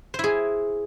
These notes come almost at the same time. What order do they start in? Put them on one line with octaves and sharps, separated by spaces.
C5 E4 G#4